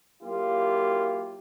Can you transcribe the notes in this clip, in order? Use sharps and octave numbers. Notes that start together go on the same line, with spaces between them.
F#3 A#3 E4 F4 G4